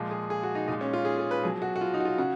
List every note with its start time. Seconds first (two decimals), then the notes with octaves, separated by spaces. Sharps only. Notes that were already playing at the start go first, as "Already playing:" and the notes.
Already playing: A#2 F3 G#3
0.11 G#4
0.30 G#4
0.43 F#4
0.55 D#4
0.68 A#2 G#3 D#4
0.81 C#4
0.93 F4
1.05 G#4
1.18 G#4
1.31 B4
1.43 B2 F#3 G#4
1.62 F#4
1.76 F#4
1.81 F4
1.94 D#4
2.00 F#4
2.05 F4
2.18 C#3 F#4